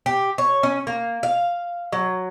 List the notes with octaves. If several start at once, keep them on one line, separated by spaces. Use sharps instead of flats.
G4
C#5
C#4
A#3
F5
F#3